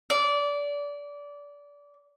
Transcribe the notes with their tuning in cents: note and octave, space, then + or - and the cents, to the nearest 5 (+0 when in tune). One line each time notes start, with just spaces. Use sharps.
D5 -25